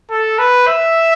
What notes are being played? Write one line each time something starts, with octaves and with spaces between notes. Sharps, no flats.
A4
B4
E5